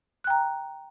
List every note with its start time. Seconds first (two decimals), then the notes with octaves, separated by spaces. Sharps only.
0.24 F#6
0.27 G5
0.30 A#5